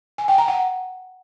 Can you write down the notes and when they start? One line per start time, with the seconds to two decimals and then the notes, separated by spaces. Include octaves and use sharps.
0.18 G#5
0.28 G5
0.38 A#5
0.48 F#5